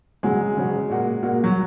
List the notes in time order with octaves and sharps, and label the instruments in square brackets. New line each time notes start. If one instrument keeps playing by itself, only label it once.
[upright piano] C#3 F#3 C#4 F#4 [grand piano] G#3
[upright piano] C#3 F#3 C#4 F#4
A#2 A#3 F#4
A#2 A#3 F#4
[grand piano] F#3